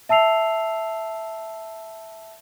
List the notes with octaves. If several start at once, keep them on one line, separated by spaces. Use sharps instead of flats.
E5 A5 E6 C7 F7